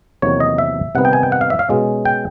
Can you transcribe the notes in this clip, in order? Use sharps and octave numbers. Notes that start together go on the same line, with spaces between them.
E2 C3 D#3 F#3 A#3 C#5
D#5
E5
C3 D#3 G3 B3 D#4 F#5
G5
G#5
G5
F#5
F5
E5
F5
B2 G#3 C#4
G5